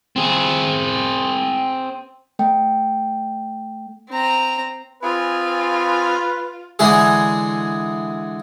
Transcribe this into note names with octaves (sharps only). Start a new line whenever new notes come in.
C4 G#4
A3 G5
C4 A#5
C4 F4 G#4 B4 G#5
D3 E3 G#3 G#4